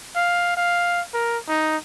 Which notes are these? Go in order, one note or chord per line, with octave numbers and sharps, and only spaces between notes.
F5
F5
A#4
D#4